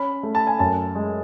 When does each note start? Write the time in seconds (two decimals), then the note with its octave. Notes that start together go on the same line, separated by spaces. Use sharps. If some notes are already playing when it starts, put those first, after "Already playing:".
Already playing: C#4 B5
0.23 A3
0.35 A5
0.47 G#5
0.59 F#2 A5
0.95 G#3